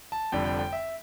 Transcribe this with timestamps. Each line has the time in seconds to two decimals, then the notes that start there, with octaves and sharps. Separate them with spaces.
0.12 A5
0.32 F1 F2 D3 G3 G5
0.45 G5
0.59 G5
0.73 E5